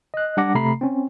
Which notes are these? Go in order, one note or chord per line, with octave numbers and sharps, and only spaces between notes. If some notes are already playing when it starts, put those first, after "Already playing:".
D#5 F#6
G3 D4 F#5 D6 A#6
C3 A3 A#5 B5 C7
C4 C#4